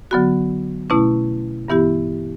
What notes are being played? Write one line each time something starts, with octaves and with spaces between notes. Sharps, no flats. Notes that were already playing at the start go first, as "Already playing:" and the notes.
D3 F#3 B3 F#4
B2 A3 C#4 E4
G2 E3 B3 E4 G4